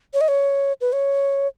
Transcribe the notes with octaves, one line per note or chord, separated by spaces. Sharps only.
C#5
D#5
C#5
B4
C#5